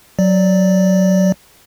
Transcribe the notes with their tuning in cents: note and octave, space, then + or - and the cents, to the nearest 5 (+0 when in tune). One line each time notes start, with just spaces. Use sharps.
F#3 +0 D5 +0